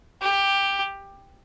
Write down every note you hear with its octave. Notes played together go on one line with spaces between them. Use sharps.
G4